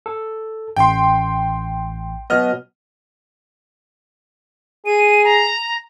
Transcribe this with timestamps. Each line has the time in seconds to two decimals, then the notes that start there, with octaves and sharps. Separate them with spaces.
0.06 A4
0.76 A1 G5 C6
2.30 B2 F#3 B3 D#5 F6
4.86 G#4 D#7
5.25 A#5